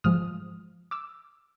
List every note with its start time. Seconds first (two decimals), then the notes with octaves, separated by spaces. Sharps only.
0.04 G#2 F3 G#3 D#6 F6
0.91 D6 E6